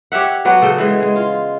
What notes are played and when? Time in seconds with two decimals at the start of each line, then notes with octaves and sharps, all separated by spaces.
0.12 G4 C#5 E5 F#5
0.45 F#3 B3 F#4 D5
0.62 C#3 A4 G5
0.78 E3 G#3
1.02 G#3
1.16 F4